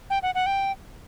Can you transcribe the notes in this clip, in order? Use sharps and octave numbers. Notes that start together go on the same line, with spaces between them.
G5
F#5
F#5
G5